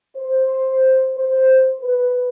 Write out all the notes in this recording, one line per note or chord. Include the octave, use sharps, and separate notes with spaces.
C5
C5
B4